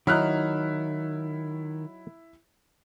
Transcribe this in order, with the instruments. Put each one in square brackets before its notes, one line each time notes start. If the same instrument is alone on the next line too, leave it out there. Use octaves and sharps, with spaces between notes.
[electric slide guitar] D#3 [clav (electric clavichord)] F#3 D#4 [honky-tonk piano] E4 F6 F#6